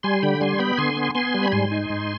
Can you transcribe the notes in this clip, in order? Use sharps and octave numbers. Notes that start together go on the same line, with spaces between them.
G3 G#5 C6
D3 G5 B5
G3 G#5 C6
B3 G5 B5
D3 G#5 C6
B3
B3 G#5 C6
G3
B5
G#2 G#5 C6
D#4
G#2